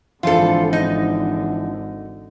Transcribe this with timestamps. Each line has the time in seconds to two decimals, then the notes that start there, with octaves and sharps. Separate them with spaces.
0.23 G#1 D3 E3 F3 D4 F4 A4
0.73 D#4